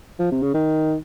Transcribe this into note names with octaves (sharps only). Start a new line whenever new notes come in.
F3
C3
C#3
D#3